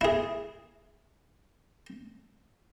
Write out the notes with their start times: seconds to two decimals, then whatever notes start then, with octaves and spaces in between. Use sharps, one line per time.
0.01 E4 G#4